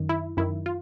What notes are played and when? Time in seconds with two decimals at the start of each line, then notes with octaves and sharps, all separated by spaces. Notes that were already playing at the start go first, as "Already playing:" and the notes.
Already playing: F#2 D#3
0.09 E4
0.37 F#2 D#3 E4
0.66 F4